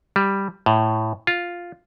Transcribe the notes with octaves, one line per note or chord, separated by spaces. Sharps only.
G3
A2
F4